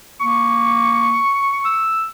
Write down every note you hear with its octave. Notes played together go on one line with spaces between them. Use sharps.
A#3 C#6
E6